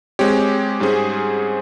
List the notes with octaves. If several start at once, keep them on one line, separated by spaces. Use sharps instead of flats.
G#3 C4 G4 C#5
G#2 G3 C#4 G#4 C5